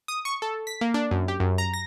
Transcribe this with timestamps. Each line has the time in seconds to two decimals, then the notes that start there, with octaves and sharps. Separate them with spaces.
0.08 D#6
0.25 C#6
0.42 A4
0.67 B6
0.81 A#3
0.94 D4
1.11 F#2
1.28 G4
1.40 F#2
1.58 A#5
1.73 A#6